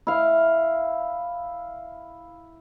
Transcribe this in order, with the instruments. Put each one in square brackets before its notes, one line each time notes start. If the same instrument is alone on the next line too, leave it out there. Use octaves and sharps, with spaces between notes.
[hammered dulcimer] E4 F5